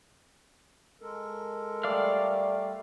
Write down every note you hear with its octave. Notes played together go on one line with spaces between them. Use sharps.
G#3 A4 A#4
G3 A3 D5 F5 F6